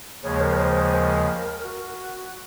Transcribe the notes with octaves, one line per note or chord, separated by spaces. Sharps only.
D#2 C#3 F3 G#3 C#5
A#4
C#5
C5
C5
A#4
F#4